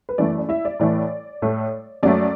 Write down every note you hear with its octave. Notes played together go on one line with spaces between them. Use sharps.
B4
F#2 E3 A3 D5
D5
E4 E5
D5
A2 E3 A3 D5
A2 A3
F#2 F#3 A3 D5